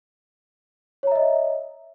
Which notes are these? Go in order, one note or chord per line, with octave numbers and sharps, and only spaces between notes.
C#5 D#5 E5 A#5